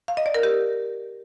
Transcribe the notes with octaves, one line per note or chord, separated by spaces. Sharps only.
F5
D#5
D5
A#4
G4